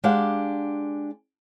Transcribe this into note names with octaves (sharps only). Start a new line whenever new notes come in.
G#3 D4 G4 D5 F5 F#5